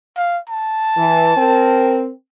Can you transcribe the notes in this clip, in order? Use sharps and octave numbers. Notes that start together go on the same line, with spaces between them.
F5
A5
E3
C4 A#4